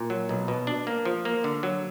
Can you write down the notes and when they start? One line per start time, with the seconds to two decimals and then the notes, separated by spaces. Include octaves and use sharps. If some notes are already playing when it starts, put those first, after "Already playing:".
Already playing: A#2
0.10 F#3
0.29 B1
0.48 B2
0.67 D4
0.87 A#3
1.05 F3
1.25 A#3
1.44 D3
1.63 F#3